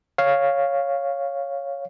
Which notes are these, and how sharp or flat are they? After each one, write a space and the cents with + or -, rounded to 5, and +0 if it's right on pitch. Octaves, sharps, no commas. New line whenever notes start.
C#5 +0 F5 +0